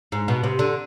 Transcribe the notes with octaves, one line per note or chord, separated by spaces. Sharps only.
G#2
B2
C3
D3